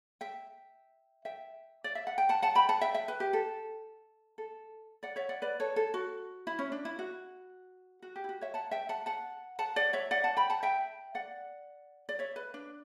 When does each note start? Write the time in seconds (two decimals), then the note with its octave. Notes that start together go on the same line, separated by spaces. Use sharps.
0.21 E5 G5
1.25 E5 G5
1.84 D5
1.95 E5
2.07 F#5
2.18 G5
2.29 F#5 A5
2.42 F#5 A5
2.55 G5 B5
2.69 F#5 A5
2.81 E5 G5
2.94 E5 G5
3.08 B4
3.20 G4
3.33 A4
4.38 A4
5.03 D5 F#5
5.16 C#5 E5
5.29 D5 F#5
5.42 B4 D5
5.60 A4 C#5
5.76 A4
5.94 F#4
6.47 E4
6.59 C#4
6.72 D4
6.85 E4
6.99 F#4
8.02 F#4
8.16 G4
8.24 E4
8.29 F#4
8.41 C#5 E5
8.54 F#5 A5
8.71 E5 G5
8.89 F#5 A5
9.06 F#5 A5
9.59 F#5 A5
9.76 D5 F#5
9.93 C#5 E5
10.11 D5 F#5
10.24 F#5 A5
10.37 G5 B5
10.50 F#5 A5
10.63 E5 G5
11.15 D5 F#5
12.09 D5
12.19 C#5 E5
12.36 B4
12.54 D4